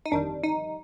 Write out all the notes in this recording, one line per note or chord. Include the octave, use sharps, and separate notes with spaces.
D#4
G1 F2 D#3 G3 D4
D#4